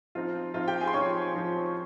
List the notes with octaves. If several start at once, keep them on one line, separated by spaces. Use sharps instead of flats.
F3 C4 D#4 F4 F5
F3 C4 D#4 F4 F5
G4 G5
G#4 G#5
C6
F3 C4 D#4 C#5 C#6
F3 C4 D#4
C#6